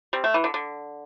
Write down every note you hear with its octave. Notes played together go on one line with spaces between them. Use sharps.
G3 C4
A3
E3
D3
D3